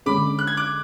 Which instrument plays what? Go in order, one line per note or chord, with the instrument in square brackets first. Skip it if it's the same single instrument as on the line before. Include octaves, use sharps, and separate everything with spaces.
[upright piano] D3 G#3 C#4 G#4 [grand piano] B5 D6
[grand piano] F#6
G#6
D6 F#6